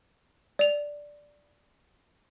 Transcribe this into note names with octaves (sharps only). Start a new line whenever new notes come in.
D5 F7